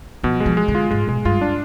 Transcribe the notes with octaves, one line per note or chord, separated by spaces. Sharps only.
B2 F3
G#3
F3
G#3
D3
F4
G#2 G#3
B2 G#3
G2 F4
D4